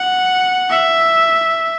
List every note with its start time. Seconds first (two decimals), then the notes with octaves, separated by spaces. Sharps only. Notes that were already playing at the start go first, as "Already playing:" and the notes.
Already playing: F#5
0.70 E5